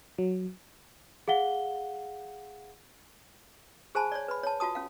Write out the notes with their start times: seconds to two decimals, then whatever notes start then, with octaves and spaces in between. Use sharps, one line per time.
0.18 F#3
1.28 G#4 F5 F#5 G7
3.95 G#4 C5 G#5 A5 B5
4.12 C#5 D5
4.28 B4 B5
4.43 C#5 A5
4.60 F4 F#4 A5 D#6
4.75 C#4 F5